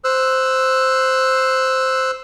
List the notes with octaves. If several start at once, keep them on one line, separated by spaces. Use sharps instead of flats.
C5 E6 F#6